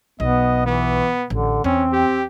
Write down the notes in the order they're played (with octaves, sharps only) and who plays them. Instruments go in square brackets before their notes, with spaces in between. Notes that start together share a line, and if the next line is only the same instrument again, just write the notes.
[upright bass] B1 [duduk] B3 [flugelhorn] D#5
[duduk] E3 [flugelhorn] B3
[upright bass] A1 [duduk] D3
[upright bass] E2 [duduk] C4 [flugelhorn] C#4
[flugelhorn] G4